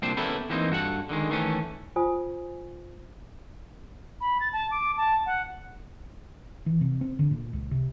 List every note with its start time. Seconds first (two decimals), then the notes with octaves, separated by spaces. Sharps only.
0.02 C2 A#2 F3 C4 D4 C5
0.17 B3 C#4 E4 G4 A4 A#4
0.49 E3 G3 A#3 C4 D#4
0.70 G2 F#4 A4 F#5
1.09 D3 D#3 G#3
1.29 D#3 E3 A3 C#4
1.96 F4 C5 G#5 D#6
4.21 B5
4.40 A6
4.53 A5
4.71 D6
4.97 A5
5.26 F#5
6.66 E3
6.81 C3
7.01 C4
7.19 D3
7.31 A#2
7.53 C#2
7.71 C3